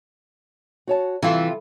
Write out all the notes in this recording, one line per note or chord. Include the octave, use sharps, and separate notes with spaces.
F#4 C#5 A5
C3 E3 F4 A4